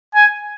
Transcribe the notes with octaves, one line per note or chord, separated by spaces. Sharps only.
G#5